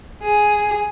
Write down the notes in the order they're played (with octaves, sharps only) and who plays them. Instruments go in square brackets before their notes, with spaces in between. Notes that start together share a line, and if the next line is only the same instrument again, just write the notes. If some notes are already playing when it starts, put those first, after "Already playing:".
[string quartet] G#4